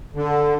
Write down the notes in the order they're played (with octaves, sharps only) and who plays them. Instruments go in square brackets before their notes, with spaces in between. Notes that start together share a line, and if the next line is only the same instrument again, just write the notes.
[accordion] D3